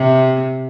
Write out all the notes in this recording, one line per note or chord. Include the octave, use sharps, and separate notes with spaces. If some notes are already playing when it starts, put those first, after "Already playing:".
Already playing: C3